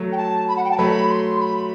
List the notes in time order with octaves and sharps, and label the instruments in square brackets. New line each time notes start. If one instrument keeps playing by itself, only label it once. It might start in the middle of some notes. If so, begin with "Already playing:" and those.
Already playing: [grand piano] F#3 A3
[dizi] G5
A5
B5
F#5
G5
A5
[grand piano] F#3 A3 [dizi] B5
[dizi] C6
B5